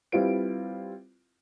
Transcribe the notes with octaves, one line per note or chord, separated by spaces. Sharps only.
G3 C4 E4 F4 B4 D7